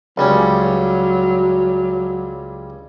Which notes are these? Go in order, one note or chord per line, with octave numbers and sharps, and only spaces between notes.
C#2 F#3 G3 C#4